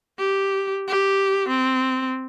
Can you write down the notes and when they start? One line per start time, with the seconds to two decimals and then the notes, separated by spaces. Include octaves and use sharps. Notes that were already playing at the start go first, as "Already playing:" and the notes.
0.19 G4
0.87 G4
1.49 C4